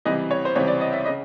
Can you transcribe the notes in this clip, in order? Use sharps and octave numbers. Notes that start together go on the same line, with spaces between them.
C#2 C3 E3 G3 D#5
C#5
C5
C#2 C3 E3 G3 C#5
D5
D#5
E5
C#3 D#5